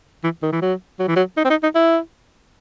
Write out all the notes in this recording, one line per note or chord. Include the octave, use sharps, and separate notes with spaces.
E3
D#3
E3
F#3
F#3
E3
F#3
D#4
C4
D#4
D#4
E4